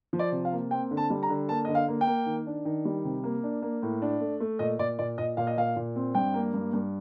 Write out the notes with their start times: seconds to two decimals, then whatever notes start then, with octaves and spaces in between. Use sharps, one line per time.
0.13 F3
0.19 D5
0.32 C3
0.45 F5
0.52 A#3
0.71 C4 G5
0.91 D3
0.97 A5
1.10 G3
1.23 A#5
1.29 D3
1.49 A#3 A5
1.65 D3 D#5
1.75 F5
1.88 A#3
2.01 G5
2.07 A#3
2.26 D#3
2.47 D4
2.65 D#3
2.85 G3
3.04 C3
3.24 A#3
3.44 D4
3.62 A#3
3.83 A2
4.02 D4
4.20 A3
4.40 A3
4.59 A#2 D#5
4.79 A#2 D5
4.99 A#2 D5
5.18 A#2 D#5
5.37 A#2 F5
5.47 D#5
5.57 A#2 F5
5.76 A#2
5.96 C4
6.15 G2 G5
6.34 A#3
6.54 G2
6.73 G2